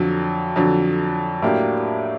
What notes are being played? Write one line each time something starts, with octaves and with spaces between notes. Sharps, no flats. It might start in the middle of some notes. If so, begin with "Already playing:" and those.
Already playing: F2 D3 F#3
F2 D3 F#3
A2 F#3 A#3 D4 G4